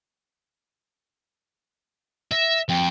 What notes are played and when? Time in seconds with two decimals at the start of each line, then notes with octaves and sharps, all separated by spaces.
2.32 E5 A#6
2.69 F2 G5